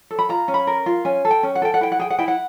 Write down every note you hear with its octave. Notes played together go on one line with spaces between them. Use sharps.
A4
B5
F4 A#5
C#4
B5
A#4
F4
C#4 G#5
A4
G5
C#4
F#5
A4 G5
F#5
E4 G5
F#5
G#4 G5
F#5
E4 G5
F#5